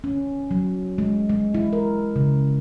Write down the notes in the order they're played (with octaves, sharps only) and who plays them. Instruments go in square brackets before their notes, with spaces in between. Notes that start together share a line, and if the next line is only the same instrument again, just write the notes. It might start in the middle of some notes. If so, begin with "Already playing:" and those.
[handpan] C#4
F#3
G#3
G#3
E4
A#4
C#3